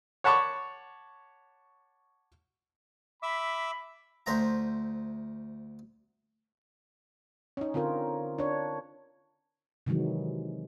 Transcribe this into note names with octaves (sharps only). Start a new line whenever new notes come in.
C#5 F#5 A5 B5 C#6 D6
E5 B5 D6 E6
D2 C5 E5 A#5
C#4 D#4
D3 C4 F4 A#4
D4 C#5
C3 D#3 E3 F#3 G#3